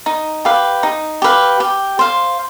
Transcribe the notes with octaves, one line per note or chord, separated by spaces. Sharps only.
D#4
G4 B4 F5
D#4
G4 B4 F5
G4
C5 F5